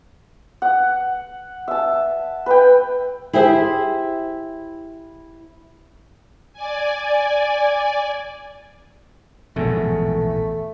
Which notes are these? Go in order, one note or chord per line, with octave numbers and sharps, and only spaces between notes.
F#5
E5 A5
B4 G5
E4 G4 G#4 C5 E5
D5 G#5
A#1 E2 G#2 B2 A3